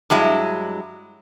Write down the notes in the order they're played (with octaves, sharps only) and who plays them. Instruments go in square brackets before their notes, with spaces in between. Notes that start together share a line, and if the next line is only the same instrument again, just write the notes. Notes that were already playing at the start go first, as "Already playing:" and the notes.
[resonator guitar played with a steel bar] G2 F#3 G#3 E4